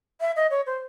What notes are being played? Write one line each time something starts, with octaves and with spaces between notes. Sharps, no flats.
E5
D#5
C#5
C5